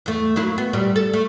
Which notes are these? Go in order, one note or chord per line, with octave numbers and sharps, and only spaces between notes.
E2 A3
F#3 A#3 E4
B3
A#2 G3
A4
A3